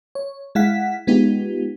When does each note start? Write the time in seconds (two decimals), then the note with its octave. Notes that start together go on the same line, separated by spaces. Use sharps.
0.15 C#5
0.55 G#3 E4 F5 F#5 B6
1.07 G#3 B3 D#4 F4 G4